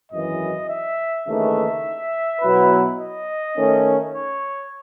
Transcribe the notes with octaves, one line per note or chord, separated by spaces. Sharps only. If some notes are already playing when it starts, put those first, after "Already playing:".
G#1 F#2 E3 D#5
E5
D#2 C#3 E3 A3 D#4 E5
B2 F#3 B3 E4 B4
D#5
D#3 A3 C#4
C#5